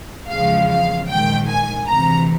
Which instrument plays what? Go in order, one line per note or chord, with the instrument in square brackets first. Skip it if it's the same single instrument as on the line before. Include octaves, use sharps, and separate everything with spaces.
[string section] E2 C#3 F3 G#3 F5
F5
A#1 G#2 D#3 G5
G#5
D2 C3 E3 A#5